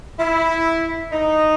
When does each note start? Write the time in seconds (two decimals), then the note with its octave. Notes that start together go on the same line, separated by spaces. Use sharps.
0.19 E4
1.13 D#4